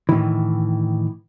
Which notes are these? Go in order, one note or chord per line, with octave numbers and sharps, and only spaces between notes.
A2 D#3 E3